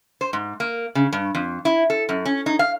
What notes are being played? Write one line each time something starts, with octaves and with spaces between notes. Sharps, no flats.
C5
G#2
A#3
C#3
G2
F2
E4
A4
F#2
C#4
D#4
F5